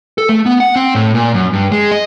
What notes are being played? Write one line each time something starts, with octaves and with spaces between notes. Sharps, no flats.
A4
A3
B3
F#5
C4
A2
A#2
F#2
G2
G#3
D#5